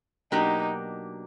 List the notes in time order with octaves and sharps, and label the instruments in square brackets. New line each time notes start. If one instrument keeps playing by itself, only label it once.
[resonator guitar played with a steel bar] B2 F#3 A#3 D4 G4 [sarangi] D#4